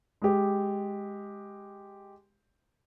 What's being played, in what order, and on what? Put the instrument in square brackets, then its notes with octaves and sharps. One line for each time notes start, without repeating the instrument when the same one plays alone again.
[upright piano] G#3 G4